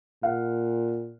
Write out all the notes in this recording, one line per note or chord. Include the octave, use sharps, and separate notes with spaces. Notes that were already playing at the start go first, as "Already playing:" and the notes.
A#2 F5 F#5